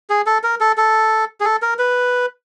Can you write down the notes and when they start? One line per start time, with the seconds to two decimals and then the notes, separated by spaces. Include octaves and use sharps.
0.10 G#4
0.26 A4
0.44 A#4
0.60 A4
0.77 A4
1.40 G#4
1.45 A4
1.62 A#4
1.79 B4